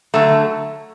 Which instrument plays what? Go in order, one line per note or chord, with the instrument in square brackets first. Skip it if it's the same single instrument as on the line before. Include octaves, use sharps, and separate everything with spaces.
[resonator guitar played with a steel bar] D3 F#3 A3